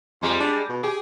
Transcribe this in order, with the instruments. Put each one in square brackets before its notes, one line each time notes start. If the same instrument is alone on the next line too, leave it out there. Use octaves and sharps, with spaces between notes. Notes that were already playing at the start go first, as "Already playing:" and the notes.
[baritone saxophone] F2 [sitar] G3 G#3
[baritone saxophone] D4
B2
[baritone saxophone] G4 [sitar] G#4